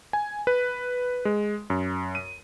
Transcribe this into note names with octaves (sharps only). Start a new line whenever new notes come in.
G#5
B4
G#3
F#2
D#7